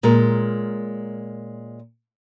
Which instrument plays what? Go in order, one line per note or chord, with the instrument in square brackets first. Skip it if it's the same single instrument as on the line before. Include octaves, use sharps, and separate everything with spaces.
[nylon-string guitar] A#2 G#3 C#4 A#4